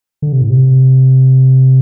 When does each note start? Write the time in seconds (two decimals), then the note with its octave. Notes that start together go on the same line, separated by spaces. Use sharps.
0.22 D3
0.32 C3
0.41 A2
0.50 C3